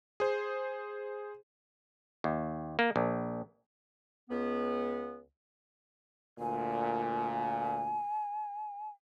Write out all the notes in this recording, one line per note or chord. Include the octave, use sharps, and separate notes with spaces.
G#4 C5
D#2
A#3
A#1
C#2 B3
D2 A#2 G#5